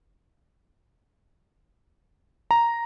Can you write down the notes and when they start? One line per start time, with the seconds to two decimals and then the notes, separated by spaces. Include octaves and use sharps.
2.51 A#5